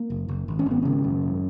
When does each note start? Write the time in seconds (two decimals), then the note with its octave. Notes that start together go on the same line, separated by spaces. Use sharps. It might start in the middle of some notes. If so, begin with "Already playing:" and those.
Already playing: A#3
0.10 F#1
0.28 F#1
0.48 G#1
0.59 C#4
0.66 G#1 B3
0.82 C#3 C#4
1.04 F#2
1.22 G#1